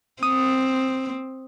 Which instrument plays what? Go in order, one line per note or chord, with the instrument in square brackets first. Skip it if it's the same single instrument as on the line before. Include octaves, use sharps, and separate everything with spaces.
[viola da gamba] C4 [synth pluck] D#6